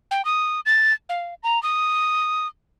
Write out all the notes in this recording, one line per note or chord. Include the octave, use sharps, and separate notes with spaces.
G5
D#6
A6
F5
A#5
D#6